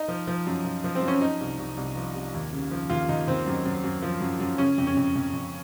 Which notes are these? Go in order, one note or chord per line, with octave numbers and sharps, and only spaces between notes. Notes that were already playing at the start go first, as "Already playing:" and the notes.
Already playing: D#4
F3
F3
F#2
F3
F3
C4
F#2
C#4
F3 D#4
C2
C2
C2
F3
C3
D#2
C#3
F3
D#2 F4
D#2 D#4
D#2 C4
F#2
F#2
F#2
F3
F#2
F#2
C#3 C#4
F2
C#4
F2
F2
F2